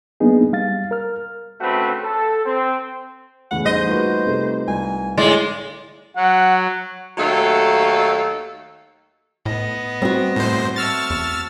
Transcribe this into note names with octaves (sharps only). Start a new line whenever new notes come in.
F#3 A#3 B3 D4 D#4 G#4
G3 F5 A6
A#4 F6
D2 C#3 A3 C4 F#4 B4
A4
C4
E2 A2 C#3 F#5
G3 A3 D#4 C5 D#5
A#3 F4 F#4 B4
C3 A3 G4
C2 G#5
A2 D3 G#3 D5
F#3 F#5
D#2 F#3 A3 A4 D#5 F5
A2 B3 D#5
G3 C4 F#4
A2 C5
A3 C#6 E6 F6 A6
E2